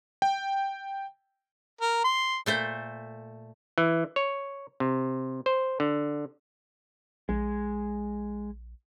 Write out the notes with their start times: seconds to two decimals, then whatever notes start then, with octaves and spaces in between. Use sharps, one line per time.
0.22 G5
1.81 A#4
2.04 C6
2.46 A#2 A3 C5
3.78 E3
4.16 C#5
4.80 C3
5.46 C5
5.80 D3
7.29 A#1 G#3